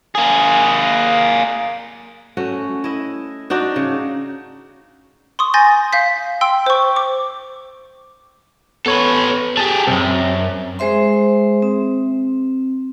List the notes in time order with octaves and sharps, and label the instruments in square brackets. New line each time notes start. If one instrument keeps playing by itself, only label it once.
[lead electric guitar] A#3 G#4
[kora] A3 C#4 F#4
E4 D#5
D4 D#4 F#4 D5
C#3
[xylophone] C6 C#6 D#6
G#5 C6 G6 A6 A#6
F5 G6 B6
G5 C6 E6
C5 C#6
D6
[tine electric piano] B3 C#5 [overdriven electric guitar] A4 B4
[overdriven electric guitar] G4 G#4 [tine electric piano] A5
[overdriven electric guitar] B1 F#2 [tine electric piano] C4
[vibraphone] G#3 G#4 C5 E5 C6
C4